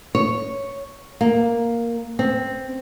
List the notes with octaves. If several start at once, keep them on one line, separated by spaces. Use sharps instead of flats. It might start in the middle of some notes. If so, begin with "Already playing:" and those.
C#5
A#3
C4